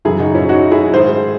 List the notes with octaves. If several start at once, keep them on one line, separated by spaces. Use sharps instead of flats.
F#2 C#3 E3 E4 G#4
D#4 F#4
C#4 E4
D#4 F#4
E4 G#4
G#2 D#3 G#4 C5